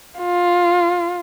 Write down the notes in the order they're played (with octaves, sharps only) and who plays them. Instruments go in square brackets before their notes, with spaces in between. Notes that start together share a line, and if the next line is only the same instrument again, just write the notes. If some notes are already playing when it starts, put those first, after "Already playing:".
[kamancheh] F4